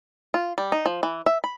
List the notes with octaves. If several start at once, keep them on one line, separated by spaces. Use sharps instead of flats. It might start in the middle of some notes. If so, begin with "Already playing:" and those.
F4
G3
D#4
F3
E3
E5
B5